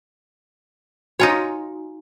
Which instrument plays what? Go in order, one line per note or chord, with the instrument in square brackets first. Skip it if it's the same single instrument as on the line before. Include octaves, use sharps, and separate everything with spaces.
[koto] D#4 F4 C#5 [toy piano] F#4 G#5 A#5